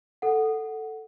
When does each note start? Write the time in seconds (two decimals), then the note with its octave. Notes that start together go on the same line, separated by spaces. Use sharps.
0.22 A4 F#5